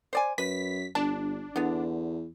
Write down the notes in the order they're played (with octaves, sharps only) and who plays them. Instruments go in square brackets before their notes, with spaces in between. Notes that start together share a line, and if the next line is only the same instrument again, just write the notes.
[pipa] C5 D5 G#5
[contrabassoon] F#2 [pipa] B4 [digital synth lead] B6
[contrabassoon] G1 [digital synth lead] D4 [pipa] A5
[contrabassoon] E2 [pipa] D3 B3